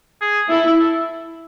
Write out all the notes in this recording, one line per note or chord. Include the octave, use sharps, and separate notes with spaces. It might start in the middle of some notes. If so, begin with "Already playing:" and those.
G#4
E4 A4
A4